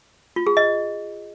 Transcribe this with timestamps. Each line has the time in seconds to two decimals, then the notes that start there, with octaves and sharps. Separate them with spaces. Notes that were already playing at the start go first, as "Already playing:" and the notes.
0.36 F4
0.47 G#4
0.57 D#5